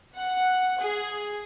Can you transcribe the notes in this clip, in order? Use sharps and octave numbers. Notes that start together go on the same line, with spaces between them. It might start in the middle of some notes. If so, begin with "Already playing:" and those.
F#5
G#4